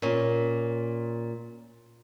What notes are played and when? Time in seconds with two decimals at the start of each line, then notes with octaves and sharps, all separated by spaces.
0.02 A#2 C#4